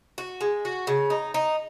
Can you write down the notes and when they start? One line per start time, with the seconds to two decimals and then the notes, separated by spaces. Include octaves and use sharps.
0.18 F#4
0.41 G#3
0.65 F#4
0.87 C#3
1.10 D#4
1.34 D#4